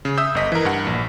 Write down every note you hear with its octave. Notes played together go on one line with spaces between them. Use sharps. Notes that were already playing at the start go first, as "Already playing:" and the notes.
C#3
E5 D#6 E6 G6
G1 D#5 B6
E3 A#4
G2 F#5
A#1